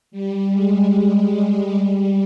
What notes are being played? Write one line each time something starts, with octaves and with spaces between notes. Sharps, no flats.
G3
G#3
G#3
G#3
G3